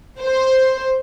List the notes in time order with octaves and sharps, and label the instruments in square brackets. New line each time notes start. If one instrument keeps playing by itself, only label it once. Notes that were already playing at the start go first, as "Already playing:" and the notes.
[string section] C5